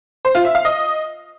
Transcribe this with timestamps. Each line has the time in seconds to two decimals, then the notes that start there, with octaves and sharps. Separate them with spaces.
0.25 C5
0.35 F4
0.45 E5
0.55 F5
0.65 D#5